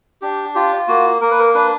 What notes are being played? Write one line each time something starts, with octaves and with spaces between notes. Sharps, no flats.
D4 G4
F4 G4
A#3 F#4
A#3 A#4
B4
A#4
D4 B4